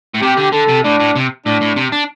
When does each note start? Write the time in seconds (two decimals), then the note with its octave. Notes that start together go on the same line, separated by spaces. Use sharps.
0.15 A2
0.22 C3 G4
0.37 D3
0.53 D3 A4
0.69 C3
0.84 A2 D4
1.00 A2
1.16 C3
1.46 A2 D4
1.61 A2
1.76 C3
1.92 D4